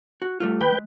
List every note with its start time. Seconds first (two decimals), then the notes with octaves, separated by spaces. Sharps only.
0.22 F#4
0.40 G3 A3 F4
0.61 D#2 B4 G5 B5
0.72 G#3